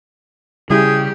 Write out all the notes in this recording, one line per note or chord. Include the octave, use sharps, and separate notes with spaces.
C#3 G3 E4 G4 G#4